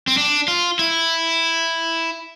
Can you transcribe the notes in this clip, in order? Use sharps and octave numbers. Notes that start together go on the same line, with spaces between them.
C4
D4
F4
E4